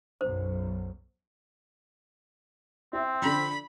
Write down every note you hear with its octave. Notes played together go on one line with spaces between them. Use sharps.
B1 F#2 C5
C4 E4 E5
D3 F3 B5